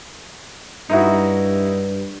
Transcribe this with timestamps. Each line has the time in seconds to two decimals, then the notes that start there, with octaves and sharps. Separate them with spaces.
0.90 G2 D#4 E4 F#4